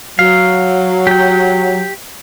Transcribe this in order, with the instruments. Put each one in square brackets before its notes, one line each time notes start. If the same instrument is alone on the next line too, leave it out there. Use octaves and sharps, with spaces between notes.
[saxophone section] F#3 [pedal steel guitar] F5
[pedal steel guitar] G4 G5